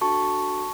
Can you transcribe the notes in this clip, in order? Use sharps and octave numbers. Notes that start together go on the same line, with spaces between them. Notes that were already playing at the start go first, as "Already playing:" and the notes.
D4 F#4 A4 A5 C#6